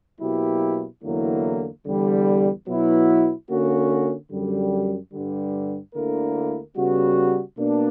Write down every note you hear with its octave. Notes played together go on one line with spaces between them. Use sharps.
B2 F#3 A#3 E4 G4
E2 D3 F#3 A#3 E4
E2 D3 G3
B2 F#3 B3 E4
D3 A#3 C#4 F#4
F#2 D3 G3
G2 D3 G3
D2 D3 A#3 E4 A#4
C#3 G3 B3 F#4
B2 A#3 D4